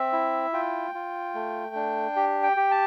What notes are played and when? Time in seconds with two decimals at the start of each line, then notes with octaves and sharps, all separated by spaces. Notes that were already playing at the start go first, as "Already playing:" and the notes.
Already playing: C4 E5
0.12 E4
0.53 F4 G5
0.95 F4
1.34 A3
1.75 D4
2.16 G4
2.43 G5
2.57 G4
2.71 A5